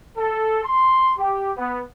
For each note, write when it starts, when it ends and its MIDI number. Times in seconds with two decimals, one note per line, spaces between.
0.18 0.59 69
0.64 1.13 84
1.18 1.52 67
1.57 1.81 59